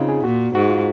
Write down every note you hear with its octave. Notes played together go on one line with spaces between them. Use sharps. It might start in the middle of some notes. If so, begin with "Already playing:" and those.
Already playing: C#3 C4 D#4 F4
G#4
A#2 F#4
G#2 F#4
F4